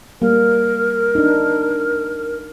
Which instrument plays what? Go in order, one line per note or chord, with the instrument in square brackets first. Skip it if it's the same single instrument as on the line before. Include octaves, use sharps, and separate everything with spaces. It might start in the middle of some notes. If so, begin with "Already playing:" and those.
[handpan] G3 A#3 [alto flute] A#4
[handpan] D4 D#4